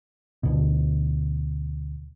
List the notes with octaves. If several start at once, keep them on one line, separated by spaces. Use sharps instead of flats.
D2 B2